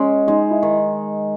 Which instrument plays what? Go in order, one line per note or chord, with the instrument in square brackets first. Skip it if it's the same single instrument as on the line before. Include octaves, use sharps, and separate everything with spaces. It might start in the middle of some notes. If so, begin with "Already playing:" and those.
Already playing: [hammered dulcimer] G#3 [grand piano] C#4
[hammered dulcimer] G#3 [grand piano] D#4
[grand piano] E4
[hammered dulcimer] D#3